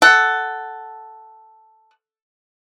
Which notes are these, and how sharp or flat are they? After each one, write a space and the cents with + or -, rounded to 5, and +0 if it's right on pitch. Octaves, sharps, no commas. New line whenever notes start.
A4 +0 F#5 +10